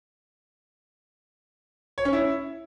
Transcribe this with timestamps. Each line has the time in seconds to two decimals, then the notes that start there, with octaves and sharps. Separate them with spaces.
1.98 C#5
2.05 C#4
2.13 E4